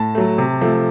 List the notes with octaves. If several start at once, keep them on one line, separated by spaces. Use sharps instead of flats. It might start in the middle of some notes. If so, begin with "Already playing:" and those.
Already playing: A2 A5
F#3 A3
C3
F3 A3